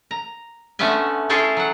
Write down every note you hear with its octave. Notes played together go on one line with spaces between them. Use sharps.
A#5
D3 A3 B3 C#4 E5 G#5
C#4 E4 G#4 A4 C5 C#5
F#3 F#5